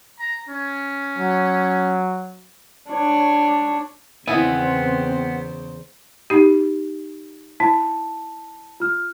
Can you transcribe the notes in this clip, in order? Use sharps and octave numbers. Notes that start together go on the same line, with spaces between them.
A#5
C#4
F#3
D4 C#5
E2 C#3 B3 C4 E4 C5 D#5 G#5
D#4 G4
E4 A5
F4 F6